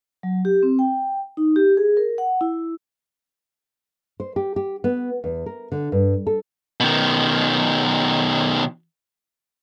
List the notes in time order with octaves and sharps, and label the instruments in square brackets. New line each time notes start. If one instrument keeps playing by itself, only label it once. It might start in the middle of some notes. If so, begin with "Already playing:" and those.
[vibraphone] F#3
G4
C4
G5
D#4
G4
G#4
A#4
F#5
E4
[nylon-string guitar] C5
G4
G4
B3
E2
A#4
D3
G2
A4
[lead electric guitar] B2 D#3